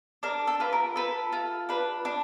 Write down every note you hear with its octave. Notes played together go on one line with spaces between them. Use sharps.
D4 A#4
A4
F4 B4
A#4
A4 B4
F4
D4 B4
D4